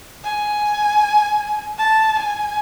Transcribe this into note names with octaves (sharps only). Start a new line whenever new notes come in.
G#5
A5
G#5